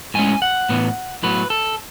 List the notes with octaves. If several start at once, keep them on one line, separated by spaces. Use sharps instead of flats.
A2 G#3 C#4 G#5
F#5
A2 E3 B3
A2 F#3 B3 B4
A4